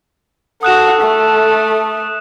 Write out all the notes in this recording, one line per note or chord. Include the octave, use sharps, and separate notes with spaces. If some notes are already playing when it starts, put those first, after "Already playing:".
F#4 A4 F#5 D#6 F#6 E7
A3